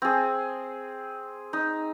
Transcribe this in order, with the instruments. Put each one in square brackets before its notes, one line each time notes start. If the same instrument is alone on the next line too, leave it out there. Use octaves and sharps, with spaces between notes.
[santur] C4 G#4
D#4